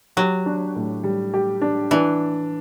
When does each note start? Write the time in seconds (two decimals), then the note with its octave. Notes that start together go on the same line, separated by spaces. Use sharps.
0.17 F#3 G4
0.46 D4
0.76 A2
1.04 G3
1.34 G4
1.62 D4
1.91 E3 D4